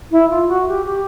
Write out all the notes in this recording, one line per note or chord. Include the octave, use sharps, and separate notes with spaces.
E4
F4
F#4
G4
G4